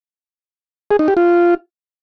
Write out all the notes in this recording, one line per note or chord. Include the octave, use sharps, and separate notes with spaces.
G#4
D#4
G4
F4